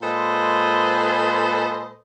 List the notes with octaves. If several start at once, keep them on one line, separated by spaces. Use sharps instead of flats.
A#2 G#3 A4 B4 C5 D#5